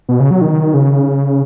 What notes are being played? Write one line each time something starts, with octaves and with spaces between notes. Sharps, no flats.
B2
C#3
F#3
D#3
C#3